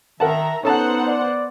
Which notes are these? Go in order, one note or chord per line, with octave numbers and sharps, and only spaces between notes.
D#3 A#4 E5 F#5 A5 A#5
B3 C#4 D#4 A4 C5 F#5 A5
D5